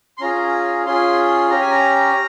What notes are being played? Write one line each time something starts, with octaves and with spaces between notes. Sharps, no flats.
C6
C#4 F4 G#4 A#5
C#4 F4 G#4 C6
C#4 G4 A#5
G#5
A#5